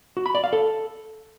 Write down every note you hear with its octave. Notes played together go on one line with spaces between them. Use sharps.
F#4
B5
D5
F5
A4